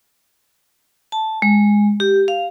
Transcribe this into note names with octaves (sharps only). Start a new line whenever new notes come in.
A5
G#3
G4
F5